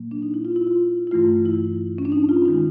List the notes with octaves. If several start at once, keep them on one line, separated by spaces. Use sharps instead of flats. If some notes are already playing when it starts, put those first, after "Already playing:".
Already playing: A#2 F#3 A#3
D4
D#4
E4
F4
E4
F4
E4
G2 E3 A3 F4
E4
C#4
D4
D#4
F4
D#3 G#3 D#4